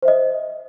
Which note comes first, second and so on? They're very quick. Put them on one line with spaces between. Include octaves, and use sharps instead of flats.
C5 E5 D#5